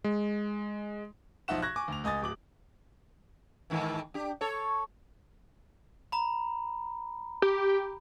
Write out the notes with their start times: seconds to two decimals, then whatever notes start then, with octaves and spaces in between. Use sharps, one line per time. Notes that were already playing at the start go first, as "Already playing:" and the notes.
0.04 G#3
1.48 B1 F3 D#4 E5 F#5 E7
1.62 C#6 F#6 G#6 A#6
1.76 G#5 C#6 D6
1.88 D2 F7
2.04 C#2 D#5 G#5 D#6 A6
2.22 D1 D6 F#7
3.70 G#2 D#3 E3
4.14 D4 G4
4.41 A4 C#5
6.12 A#5 B5
7.42 G4